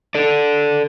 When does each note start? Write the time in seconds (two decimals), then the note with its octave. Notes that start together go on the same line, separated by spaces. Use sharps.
0.15 A4 D5